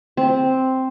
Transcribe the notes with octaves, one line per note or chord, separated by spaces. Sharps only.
C4